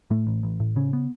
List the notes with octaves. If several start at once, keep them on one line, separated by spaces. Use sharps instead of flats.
A2 A3
A1
A1
A2
C#3 C#4
B3